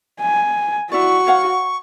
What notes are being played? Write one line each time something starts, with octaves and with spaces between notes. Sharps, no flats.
G#5
E4 F#4 D5 C#6
C#5 F5 F#5